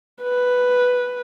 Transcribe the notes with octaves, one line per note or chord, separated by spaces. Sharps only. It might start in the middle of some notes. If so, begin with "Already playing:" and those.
B4